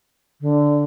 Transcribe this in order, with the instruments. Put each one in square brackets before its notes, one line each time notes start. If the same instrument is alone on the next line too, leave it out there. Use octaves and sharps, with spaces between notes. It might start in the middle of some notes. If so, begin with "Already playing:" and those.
[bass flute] D3